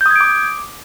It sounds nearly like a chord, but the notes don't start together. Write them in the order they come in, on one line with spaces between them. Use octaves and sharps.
G6 D#6 G#6 D7 D6